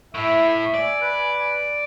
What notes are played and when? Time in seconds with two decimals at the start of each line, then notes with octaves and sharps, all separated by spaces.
0.14 A2 E4 E5
0.74 D5 G#5
1.01 B4